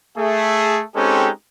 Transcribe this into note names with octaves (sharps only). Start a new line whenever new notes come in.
A3 G#4 E5
G#3 C4 C#4 D#4 G4 A4